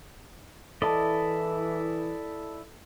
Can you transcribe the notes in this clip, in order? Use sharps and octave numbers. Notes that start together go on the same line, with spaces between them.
E3 E4 A4 D5 D#5 A5